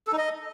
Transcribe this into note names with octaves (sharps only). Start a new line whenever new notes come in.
A4
D#4
D#5